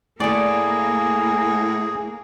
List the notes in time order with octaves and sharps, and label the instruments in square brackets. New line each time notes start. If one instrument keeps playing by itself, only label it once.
[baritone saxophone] A2 [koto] A3 D5 [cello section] A#3 [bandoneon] G#4